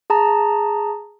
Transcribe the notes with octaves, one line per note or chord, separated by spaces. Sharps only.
G#4 A5 A#5